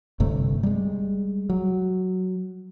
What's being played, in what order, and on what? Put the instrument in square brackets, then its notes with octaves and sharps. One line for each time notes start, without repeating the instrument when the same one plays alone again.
[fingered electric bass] G1 G2 C3 A3
G3 G#3
F#3